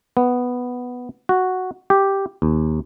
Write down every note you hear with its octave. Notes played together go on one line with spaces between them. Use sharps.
B3
F#4
G4
D#2